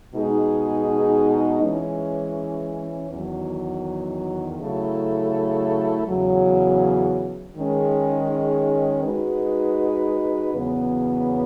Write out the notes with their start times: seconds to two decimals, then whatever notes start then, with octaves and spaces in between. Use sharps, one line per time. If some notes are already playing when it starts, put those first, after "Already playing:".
0.14 B2 G#3 D#4 G#4
1.62 E3 G#3 C#4
3.10 E2 D#3 F#3
4.60 C#3 F#3 A3 E4 A4
6.08 E2 C#3 F#3
7.56 D#3 G#3 C#4 G#4
9.04 G#3 D#4 F#4 B4
10.53 E2 C#3 F#3 B3